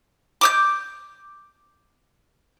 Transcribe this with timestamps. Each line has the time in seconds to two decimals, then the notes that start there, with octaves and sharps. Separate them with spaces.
0.41 D6 D#6 G6